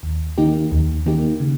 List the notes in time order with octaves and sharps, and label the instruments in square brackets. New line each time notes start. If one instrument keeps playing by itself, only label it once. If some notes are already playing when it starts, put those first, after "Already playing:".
[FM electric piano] D#2
D#3 A#3 D#4 G4
D#2
D#3 A#3 D#4 G4
C#3